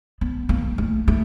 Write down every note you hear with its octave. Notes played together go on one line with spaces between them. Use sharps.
B3
A#3
A3
A3